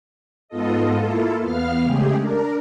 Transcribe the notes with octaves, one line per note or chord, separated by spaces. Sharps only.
G#2 B3 F4 A4 D#5
A#3 E4 F4 A4
E2 B3 F5 F6
C#3 G#3 A3 G4 G#4
D4 A#4